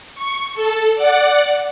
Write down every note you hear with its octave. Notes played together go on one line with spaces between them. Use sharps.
C#6
A4
D5 F#5